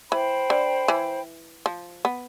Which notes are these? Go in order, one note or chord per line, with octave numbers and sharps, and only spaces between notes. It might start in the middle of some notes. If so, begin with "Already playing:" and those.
E3 C5 G5 B5
D3
E3
F3
B3